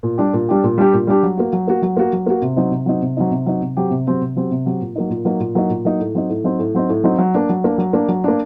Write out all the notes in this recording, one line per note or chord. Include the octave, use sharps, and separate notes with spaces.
A#2
G3 D4 G4
A#2
G3 D4 G4
A#2
G3 D4 G4
A#2
G3 D4 G4
F#3
A#3 F#4
F#3
A#3 F#4
F#3
A#3 F#4
F#3
A#3 F#4
C3
F#3 C4 D#4
C3
F#3 C4 D#4
C3
F#3 C4 D#4
C3
F#3 C4 D#4
C3
F#3 C4 G4
C3
F#3 C4 G4
C3
F#3 C4 G4
C3
F#3 C4 G4
A#2
F#3 A#3 D#4
A#2
F#3 A#3 D#4
A#2
F#3 A#3 D#4
A#2
F#3 A#3 D#4
A2
F#3 C4 D#4
A2
F#3 C4 D#4
A2
F#3 C4 D#4
A2
F#3 C4 D#4
F#3
A#3 D4
F#3
A#3 D4
F#3
A#3 D4
F#3
A#3 D4